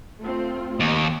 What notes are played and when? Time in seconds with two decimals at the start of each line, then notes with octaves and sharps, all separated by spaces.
0.22 A3 C4 F4
0.80 D#2 D#5